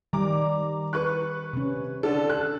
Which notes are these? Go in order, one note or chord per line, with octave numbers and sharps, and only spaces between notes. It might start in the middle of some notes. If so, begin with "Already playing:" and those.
D#3 G3 A#5 D6
B4 C#6 F#6
C3 C#4
D3 D4 A4
A4 F#6